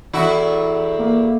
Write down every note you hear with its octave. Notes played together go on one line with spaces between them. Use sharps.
E2 E4 F#4 A4 E5
A#3